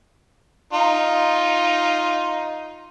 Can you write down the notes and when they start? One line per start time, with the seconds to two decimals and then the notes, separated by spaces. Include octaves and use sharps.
0.73 D#4 F4